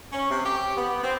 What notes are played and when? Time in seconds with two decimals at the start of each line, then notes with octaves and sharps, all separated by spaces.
0.12 C#4
0.30 C3
0.46 G4
0.77 B3
1.03 C4